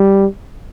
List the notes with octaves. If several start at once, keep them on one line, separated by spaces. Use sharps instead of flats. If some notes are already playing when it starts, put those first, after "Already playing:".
Already playing: G3